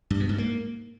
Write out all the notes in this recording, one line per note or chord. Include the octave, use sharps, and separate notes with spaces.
G2
B2
G#2
A#3